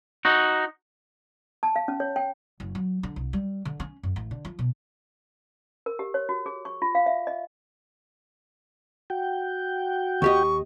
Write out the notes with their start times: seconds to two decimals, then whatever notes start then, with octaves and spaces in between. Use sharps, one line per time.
0.25 D#4 F#4
1.63 A5
1.76 F5
1.88 C#4
2.00 C#5
2.16 G5
2.60 F#1
2.75 F#3
3.03 D3
3.16 C2
3.33 G3
3.65 D3
3.80 C#4
4.03 F#2
4.16 A1
4.31 D3
4.45 F3
4.59 B2
5.86 A#4
5.99 G4
6.14 C#5
6.29 F#4
6.46 G#4
6.65 C#6
6.82 F4
6.95 F5
7.06 E5
7.27 D#5
9.10 F#4 G5
10.22 D#2 G4 D#5 C#6